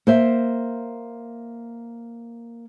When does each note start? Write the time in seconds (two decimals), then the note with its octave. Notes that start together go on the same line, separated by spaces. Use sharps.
0.07 A#3 C5 E5